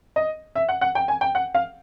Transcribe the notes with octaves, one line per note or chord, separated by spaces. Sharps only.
D#5
E5
F#5
F#5
G5
G#5
G5
F#5
F5